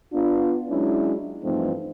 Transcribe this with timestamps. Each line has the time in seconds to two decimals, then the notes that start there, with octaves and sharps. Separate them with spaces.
0.13 B3 D4 F4
0.69 F#3 G#3 C#4 D4 E4
1.44 G2 E3 F3 A3 C4 D#4